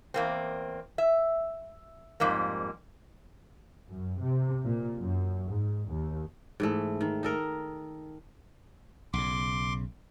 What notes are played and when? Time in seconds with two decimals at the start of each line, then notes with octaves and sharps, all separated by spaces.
0.14 E2 A#3 C4
0.98 E5
2.20 F2 G#2 G3 A#3
3.91 F#2
4.20 C3
4.64 A#2
4.99 F#2
5.50 G#2
5.88 D#2
6.60 G#2 E3 A3
7.01 D#3
7.23 D#4 A4 A#4
9.13 B1 C#3 C6 D6